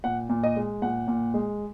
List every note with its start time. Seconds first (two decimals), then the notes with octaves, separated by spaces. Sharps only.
0.04 A#2 F#5
0.29 A#2
0.43 D#5
0.56 G#3
0.82 A#2 F#5
1.08 A#2
1.34 G#3